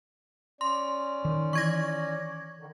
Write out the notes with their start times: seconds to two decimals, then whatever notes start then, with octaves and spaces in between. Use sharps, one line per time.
0.61 C#4 D5 C6
1.25 D#3
1.53 E3 E4 C#6 G#6 A#6
2.57 D3 D#3